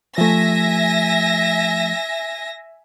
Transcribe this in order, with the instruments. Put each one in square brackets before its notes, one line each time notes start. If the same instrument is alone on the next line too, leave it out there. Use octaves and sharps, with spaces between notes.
[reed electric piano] F3 A3 [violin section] E5 G#5 A#6